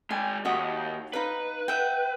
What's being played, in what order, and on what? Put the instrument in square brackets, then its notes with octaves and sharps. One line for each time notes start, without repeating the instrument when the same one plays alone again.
[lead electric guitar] G#3 G5 [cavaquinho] G#5
[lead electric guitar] D#2 [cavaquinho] F#4 D#5 E5
[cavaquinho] D#4 F5 B5 [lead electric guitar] B4
[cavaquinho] E5 F#5 G5